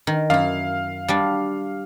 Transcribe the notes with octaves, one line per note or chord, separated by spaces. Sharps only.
D#3
F#2 E4 F5
G3 D4